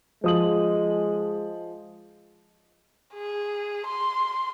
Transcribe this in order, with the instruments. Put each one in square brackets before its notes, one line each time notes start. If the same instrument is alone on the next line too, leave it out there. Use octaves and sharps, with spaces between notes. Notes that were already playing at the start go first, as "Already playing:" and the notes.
[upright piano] F3 D#6 F#7 [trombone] G#3
[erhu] G#4
C6